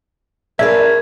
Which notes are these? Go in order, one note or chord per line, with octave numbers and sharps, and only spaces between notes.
D4 G#4 A#4 B4 C#5 E5